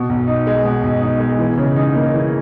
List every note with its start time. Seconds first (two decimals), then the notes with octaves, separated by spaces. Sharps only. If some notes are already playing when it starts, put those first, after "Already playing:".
Already playing: B2
0.09 B1
0.27 D#4
0.47 G#3
0.65 B2
0.84 B1
1.01 D#4
1.20 G#3
1.39 E3
1.58 C#3
1.76 D#4
1.95 A#3
2.14 E3